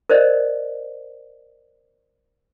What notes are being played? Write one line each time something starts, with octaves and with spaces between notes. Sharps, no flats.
A#4 C5 D5 D#5